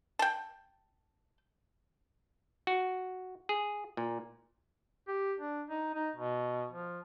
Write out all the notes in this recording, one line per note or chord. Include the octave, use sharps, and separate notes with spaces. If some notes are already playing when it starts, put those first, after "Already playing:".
G5 A5
F#4
G#4
A#2
G4
D4
D#4
D#4
B2
F3